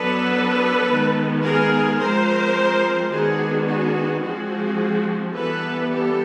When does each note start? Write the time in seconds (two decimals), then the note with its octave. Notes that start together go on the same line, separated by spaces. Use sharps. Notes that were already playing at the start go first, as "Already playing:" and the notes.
Already playing: F#3 B3 D4 A4 B4
0.87 D#3 G#3 B3
1.42 G#4 A#4
1.98 F3 G#3 C4 A#4 C5
3.10 D#3 G#3 B3 D4 F#4 G#4
3.66 F#4 G#4
4.22 F3 G#3 C4 F#4 G#4
5.34 E3 G3 B3 D4 A4 B4
5.91 G4 A4